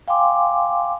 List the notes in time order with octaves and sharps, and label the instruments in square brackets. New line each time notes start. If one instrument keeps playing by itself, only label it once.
[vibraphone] F5 G5 G#5 C6 D6